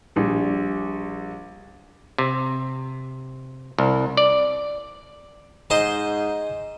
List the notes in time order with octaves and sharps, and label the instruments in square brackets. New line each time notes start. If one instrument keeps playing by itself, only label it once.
[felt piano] A#1 G3
[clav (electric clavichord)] C3
C2
D5
[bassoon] G#2 [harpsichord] C5 D#5 C6